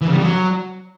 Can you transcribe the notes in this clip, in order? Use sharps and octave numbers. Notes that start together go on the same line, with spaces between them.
E3
C#3
G3
F2
F#3